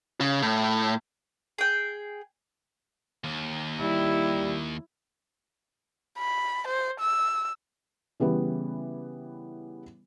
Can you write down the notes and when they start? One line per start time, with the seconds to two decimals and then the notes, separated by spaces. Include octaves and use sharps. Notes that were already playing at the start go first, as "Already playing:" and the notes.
0.20 C#3
0.42 A2
1.58 G#4 G5
3.24 D#2
3.81 G3 E4
6.19 B5
6.68 C5
7.01 E6
8.20 C#3 E3 G3 B3 B4